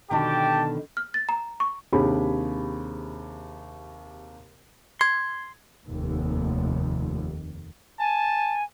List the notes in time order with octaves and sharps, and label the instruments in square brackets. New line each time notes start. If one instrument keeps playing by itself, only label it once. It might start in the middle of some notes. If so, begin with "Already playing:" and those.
[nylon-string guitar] B2 D3 D#3 [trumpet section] G4 G5 A5
[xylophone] F6
A6
A#5
C#6
[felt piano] D#2 C3 D4 G4 G#4 B5
[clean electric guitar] C6 [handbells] G#6
[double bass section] F1 D#2
[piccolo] G#5 [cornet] A5